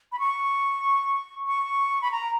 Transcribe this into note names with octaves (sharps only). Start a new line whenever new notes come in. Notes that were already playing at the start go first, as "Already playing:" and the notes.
B5
C#6
C#6
B5
A#5